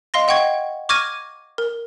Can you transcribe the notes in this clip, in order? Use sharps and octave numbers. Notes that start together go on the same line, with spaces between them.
D#5 F5 C6 A#6
D#5 F#5 G5 C#6 G#6
C#6 D6 F6 G#6 A#6 D#7
A#4